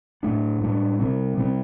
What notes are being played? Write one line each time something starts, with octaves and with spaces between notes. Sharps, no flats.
A2 A3 D4
A2 G3 D4
C3 G3 C4
C3 G3 C4